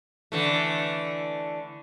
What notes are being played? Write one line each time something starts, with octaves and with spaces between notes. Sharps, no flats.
D3 E3 A3